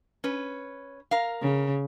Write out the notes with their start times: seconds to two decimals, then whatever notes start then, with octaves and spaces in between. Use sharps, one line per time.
0.24 C#4 B4
1.11 A#4 F5
1.41 C#3